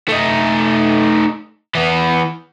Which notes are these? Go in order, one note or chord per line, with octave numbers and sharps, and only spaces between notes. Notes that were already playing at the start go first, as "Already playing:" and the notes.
A3 D#4
E3 B3